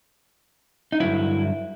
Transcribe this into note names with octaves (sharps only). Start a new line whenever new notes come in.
D#4
G2 D3 F#3 E4